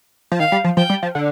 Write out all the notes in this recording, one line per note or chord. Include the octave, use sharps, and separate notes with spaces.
F3
D#3 F5
G3
F3
F3 G5
G3
F3
D3